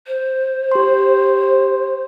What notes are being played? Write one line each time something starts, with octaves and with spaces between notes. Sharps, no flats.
C5
G4 C6